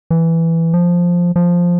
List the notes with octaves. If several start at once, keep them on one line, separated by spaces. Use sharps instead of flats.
E3
F3
F3